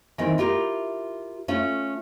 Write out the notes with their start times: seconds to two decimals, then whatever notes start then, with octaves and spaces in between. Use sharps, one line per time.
0.18 D#3 E3 C4
0.38 E4 F4 G4 A#4
1.48 A3 C#4 F4